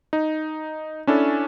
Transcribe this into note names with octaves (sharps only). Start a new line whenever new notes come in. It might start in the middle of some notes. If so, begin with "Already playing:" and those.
D#4
C#4 D4 E4 A4